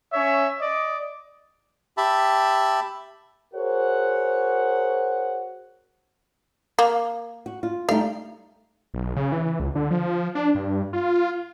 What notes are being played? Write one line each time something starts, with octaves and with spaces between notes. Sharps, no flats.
C#4 C#5 E5
D5 D#5
G4 E5 A5 B5
F#4 G#4 A#4 C5 C#5 F#5
A#3
F#4
F4
G3 A3 D#4 F5
B1
C#3
E3
C#2
D3
F3
D4
G2
F4